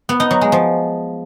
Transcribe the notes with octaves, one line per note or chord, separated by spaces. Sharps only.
B3
D#4
F#3
G#3
F3